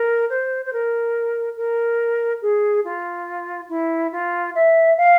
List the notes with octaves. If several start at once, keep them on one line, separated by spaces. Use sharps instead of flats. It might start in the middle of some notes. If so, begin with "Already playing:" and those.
Already playing: A#4
C5
C5
A#4
A#4
G#4
F4
E4
F4
E5
F5